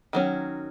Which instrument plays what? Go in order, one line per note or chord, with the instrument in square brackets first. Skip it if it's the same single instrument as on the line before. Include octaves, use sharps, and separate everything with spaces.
[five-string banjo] D#3 F#3 C#4